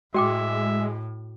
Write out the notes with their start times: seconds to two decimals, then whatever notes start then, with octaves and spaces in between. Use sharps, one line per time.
0.14 A2 G#3 F#4 E5 G5 D6